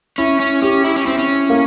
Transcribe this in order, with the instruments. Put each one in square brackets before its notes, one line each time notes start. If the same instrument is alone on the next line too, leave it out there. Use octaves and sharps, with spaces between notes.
[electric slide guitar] C#4 [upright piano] E4
[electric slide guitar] C#4
[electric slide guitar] C#4 [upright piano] G4
[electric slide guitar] E4
C#4
[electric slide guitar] C4 [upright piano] E4
[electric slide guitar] C#4
[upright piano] A#3